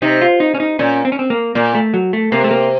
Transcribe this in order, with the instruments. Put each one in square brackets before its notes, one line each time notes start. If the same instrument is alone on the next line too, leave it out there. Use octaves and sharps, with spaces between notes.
[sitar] C3 [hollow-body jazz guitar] D#4
[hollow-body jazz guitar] F4
D#4
C#4
D#4
[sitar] A#2 [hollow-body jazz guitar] C#4
[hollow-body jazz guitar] C4
C#4
C4
A#3
[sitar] A#2 [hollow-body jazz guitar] A#3
[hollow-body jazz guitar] A3
F#3
A3
[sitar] C3 [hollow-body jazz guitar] A#3
[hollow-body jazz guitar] A3
A#3